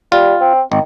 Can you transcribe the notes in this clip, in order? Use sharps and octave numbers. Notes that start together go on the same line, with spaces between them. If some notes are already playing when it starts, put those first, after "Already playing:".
G3 F4
C4
G#1 D#3